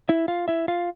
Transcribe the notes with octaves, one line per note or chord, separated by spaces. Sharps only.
E4 E5
F4 F5
E4 E5
F4 F5